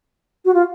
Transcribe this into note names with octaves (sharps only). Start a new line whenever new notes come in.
F#4
F4